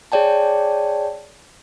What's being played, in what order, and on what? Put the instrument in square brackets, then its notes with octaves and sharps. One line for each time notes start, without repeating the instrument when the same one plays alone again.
[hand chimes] G#4 C#5 D5 G5 A5